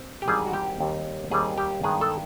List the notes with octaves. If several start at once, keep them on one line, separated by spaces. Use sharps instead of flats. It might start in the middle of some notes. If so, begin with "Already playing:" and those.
Already playing: C4
G4
G#1 G#2 E3 G3 C4 G#4
F#4
G4
D#2 D#3 G3 C4
D#2 D#3 G3 C4 G#4
G4
G2 D#3 G#3 B3 G#4
A4